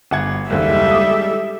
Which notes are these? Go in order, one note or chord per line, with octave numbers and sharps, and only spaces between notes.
G1 F#5 G#6
F#1 D#2 G3 G#3 A4 E5
D6 D#6